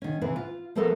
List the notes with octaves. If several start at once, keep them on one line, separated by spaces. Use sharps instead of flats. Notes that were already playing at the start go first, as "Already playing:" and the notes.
D#3 C#4
C3 E3 C4 B4
F4
F3 A3 B3 E4 A4 A#4